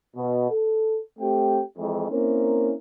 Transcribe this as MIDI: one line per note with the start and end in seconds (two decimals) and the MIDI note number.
0.16 0.49 47
0.51 1.00 69
1.19 1.60 57
1.19 1.60 60
1.19 1.60 67
1.19 1.60 79
1.77 2.10 41
1.77 2.10 52
1.77 2.10 56
1.77 2.10 64
2.10 2.73 58
2.10 2.73 60
2.10 2.73 61
2.10 2.73 64
2.10 2.73 70